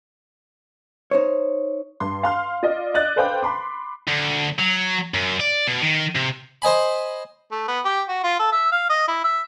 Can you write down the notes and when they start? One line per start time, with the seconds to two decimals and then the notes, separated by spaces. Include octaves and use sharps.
1.11 D#4 C5 C#5
2.00 G2 C6
2.23 F5 C6 F6
2.63 F4 D5 D#5
2.94 D5 D#5 F#6 A6
3.16 A4 B4 C5 F5 G5 D6
3.43 B5 C6 D6
4.08 D2
4.59 F#3
5.14 F#2
5.40 D5
5.67 B2
5.82 D#3
6.15 C3
6.62 C5 D#5 G#5 B5
7.52 A3
7.68 B3
7.85 G4
8.08 F#4
8.24 F4
8.39 A4
8.52 E5
8.72 F5
8.90 D#5
9.08 E4
9.24 E5